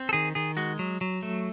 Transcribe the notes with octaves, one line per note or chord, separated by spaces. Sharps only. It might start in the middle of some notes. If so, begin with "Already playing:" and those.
Already playing: C4
A4
D#3 G#4
D#3 G#4
G#3 F#4
F#3
F#3
A3